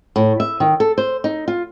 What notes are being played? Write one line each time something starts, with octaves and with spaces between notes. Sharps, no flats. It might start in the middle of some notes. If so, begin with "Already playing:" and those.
A2
E5
D#3
A4
C5
D#4
F4